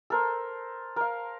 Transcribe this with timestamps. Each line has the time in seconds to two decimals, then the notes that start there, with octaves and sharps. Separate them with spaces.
0.10 A4 A#4 C5
0.96 A#4 F5